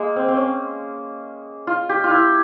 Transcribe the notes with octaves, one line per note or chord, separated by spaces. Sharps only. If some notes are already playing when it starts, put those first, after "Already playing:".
Already playing: G#3 A#3
C4
C4
C#4
F4
G4
F4
E4